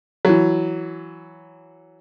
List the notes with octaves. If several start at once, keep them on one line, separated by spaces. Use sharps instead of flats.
E3 F#3